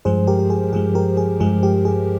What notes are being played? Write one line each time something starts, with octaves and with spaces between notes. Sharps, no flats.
G2 F3 G#3 G#4 C5
G4 A#4
G4
G#4
G2 F3 G#3 G#4
G4 A#4
G#4
G2 F3 G#3 G#4
G4
G#4